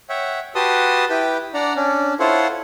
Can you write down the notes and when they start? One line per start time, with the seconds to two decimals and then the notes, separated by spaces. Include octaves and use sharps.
0.09 C#5 E5 F#5 G5
0.55 F#4 G4 B4 A5 C6 D#6
1.10 E4 G4 B4 G5
1.54 D4 D5 F#5 A#5
1.76 C#4 D4
2.20 E4 F4 A4 C5 C#5 F#5